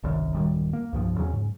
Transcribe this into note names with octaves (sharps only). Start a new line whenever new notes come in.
G1 C2 F#2 D#3
D1 F#2 D#3 G3
A#3
C2 G2 F3
E2 C#3 F#3 C#4
G#2